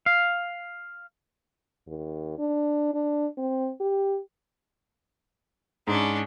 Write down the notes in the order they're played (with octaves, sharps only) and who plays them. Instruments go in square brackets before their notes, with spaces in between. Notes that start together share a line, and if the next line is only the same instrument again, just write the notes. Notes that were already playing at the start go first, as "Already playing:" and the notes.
[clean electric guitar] F5
[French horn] D#2
D4
D4
C4
G4
[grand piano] G#2 [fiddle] C#4 D4